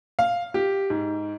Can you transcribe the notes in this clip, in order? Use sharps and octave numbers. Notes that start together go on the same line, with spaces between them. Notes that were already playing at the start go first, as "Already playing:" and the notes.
F5
G4
G#2